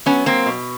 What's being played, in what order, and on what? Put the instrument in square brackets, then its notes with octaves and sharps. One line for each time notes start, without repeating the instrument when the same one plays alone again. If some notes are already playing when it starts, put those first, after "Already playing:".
[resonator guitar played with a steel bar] F#3 B3 C#4
A#3 C4
B2